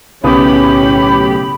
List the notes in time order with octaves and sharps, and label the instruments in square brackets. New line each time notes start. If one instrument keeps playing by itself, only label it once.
[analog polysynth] B1 A2 G4 [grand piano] C#3 B3 D#6 [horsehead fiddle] C#4 [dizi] B5